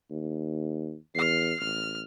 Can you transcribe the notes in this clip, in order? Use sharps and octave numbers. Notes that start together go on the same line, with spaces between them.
D#2
E2 F6 C7
A1 F6